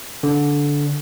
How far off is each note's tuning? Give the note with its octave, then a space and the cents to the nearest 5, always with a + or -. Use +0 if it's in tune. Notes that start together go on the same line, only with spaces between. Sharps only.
D3 -15